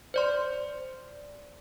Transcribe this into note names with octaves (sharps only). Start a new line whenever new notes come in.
C5 D5 C6